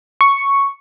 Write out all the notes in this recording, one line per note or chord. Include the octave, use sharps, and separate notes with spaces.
C#6